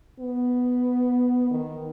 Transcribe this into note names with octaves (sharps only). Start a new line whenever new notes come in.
B3
D#3